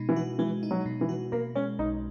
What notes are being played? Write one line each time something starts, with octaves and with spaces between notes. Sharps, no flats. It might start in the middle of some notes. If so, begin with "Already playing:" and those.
Already playing: B2 G#3 D#4
E3
F#4
E3 G#3
D#4
F#3
B2
E3
F#4
B2 A#3
G#3 C#4
B1 D#4